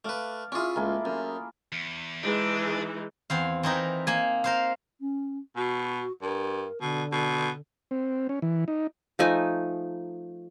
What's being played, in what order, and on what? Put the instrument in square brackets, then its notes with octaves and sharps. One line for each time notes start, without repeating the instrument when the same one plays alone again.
[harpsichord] A3 B4 [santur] D5 F5
[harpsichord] C#4 G#4 [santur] E4 F4 D6
[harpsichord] C#2 [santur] A3 A#3 G#4
[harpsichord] F#2
[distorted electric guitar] E2
[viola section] E3 G#3 D#4 [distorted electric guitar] D4
[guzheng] E2 C4 F5
E3 C4 D#4 A#4
A#3 G#5
A#4 C5 F5
[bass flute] C#4
[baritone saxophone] B2 [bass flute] F#4
[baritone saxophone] G2 [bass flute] A#4
[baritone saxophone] B2 [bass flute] D3
[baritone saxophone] B2
[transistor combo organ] C4
C#4
E3
D#4
[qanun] F3 A3 D#4 G#5